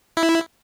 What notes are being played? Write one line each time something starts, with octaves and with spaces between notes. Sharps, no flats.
E4